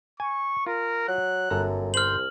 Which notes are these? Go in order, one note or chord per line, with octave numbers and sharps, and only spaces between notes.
G#5 C#6
F4 A#4
F#3 F#6
G1 F#2 A4 A#5
C2 C5 F6 F#7